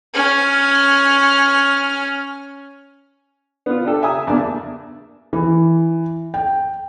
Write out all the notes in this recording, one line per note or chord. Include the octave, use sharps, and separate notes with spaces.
C#4 F6
B3 F4
D4 G4 A4
E5 G#5 A#5 D#6 E6
A#1 E2 D4 D5 A5
E3
G5